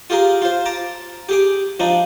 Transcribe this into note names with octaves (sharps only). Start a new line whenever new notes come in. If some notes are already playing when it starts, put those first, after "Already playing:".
F4 G4 G#4 A#4
F4 C5
A5 A#5 D6
G4 G#4 D6
F3 D4 D#4